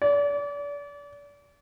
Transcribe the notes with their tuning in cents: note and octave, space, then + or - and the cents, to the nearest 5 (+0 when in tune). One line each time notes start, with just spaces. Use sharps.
D5 -35